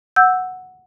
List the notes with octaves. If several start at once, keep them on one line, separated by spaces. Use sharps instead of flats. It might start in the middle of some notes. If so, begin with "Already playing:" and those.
F#5 E6 G6